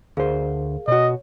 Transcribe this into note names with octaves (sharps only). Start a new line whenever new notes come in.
D2 G#4 A#4 C5 F5
B2 F#4 C#5 D#5